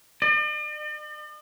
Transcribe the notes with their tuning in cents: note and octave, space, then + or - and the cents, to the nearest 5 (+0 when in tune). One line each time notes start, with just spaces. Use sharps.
D5 +45